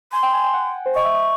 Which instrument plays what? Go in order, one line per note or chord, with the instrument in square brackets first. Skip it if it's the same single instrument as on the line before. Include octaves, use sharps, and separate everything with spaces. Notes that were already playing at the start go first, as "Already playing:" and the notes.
[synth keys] G#5 [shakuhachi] C6
[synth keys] G5
G#5
G5
F#5
C5
[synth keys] D#5 [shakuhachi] C#6
[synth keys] E5
D#5